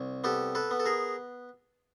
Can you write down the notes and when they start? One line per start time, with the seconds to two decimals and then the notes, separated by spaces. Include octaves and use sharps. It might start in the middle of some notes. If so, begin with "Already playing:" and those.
Already playing: C2
0.24 B3 G4 A4
0.55 A4 B4
0.71 B3
0.80 A4
0.86 G#4 A#4